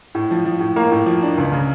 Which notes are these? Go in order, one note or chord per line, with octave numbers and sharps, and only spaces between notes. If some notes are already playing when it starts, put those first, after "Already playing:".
A2
F3
F3
A2
A#3
A2
F3
D4
C#2
C#3